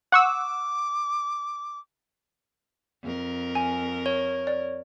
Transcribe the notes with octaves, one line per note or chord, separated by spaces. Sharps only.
F#5 C#6 D6 E6
F2 A#4
G#5
C#5
D5